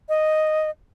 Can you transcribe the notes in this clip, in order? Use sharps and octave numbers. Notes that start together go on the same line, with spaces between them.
D#5